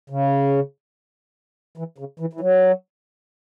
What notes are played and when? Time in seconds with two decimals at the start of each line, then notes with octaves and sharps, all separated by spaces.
0.10 C#3
1.77 E3
1.98 C#3
2.20 E3
2.33 E3
2.40 F#3